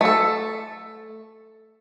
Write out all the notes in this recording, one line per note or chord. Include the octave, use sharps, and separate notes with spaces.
A3 A4